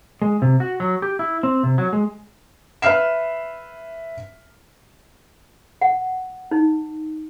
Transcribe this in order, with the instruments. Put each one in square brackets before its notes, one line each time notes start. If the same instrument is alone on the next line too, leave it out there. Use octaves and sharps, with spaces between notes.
[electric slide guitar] G#3
C3
F#4
F#3
G4
E4
C4
C3
F#3
G#3
[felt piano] B4 E5 F6 C7 E7
[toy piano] F#5
D#4